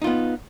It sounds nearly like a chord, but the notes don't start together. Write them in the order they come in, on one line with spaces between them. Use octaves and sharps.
D#4 F4 B3